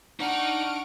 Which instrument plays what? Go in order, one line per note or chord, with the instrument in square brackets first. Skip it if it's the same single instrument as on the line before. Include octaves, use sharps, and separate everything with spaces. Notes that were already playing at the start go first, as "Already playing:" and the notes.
[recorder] D4 [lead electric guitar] D#4 A#5 [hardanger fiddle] F#5 [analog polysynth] C#6 F6 D7